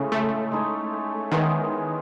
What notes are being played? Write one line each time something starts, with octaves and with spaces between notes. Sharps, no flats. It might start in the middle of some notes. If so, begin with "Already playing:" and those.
Already playing: A2 C#3 G#3 C#4 G#4
A3
G#3 D#4 A4 C#5
D#3 E3 G#3 B3 E4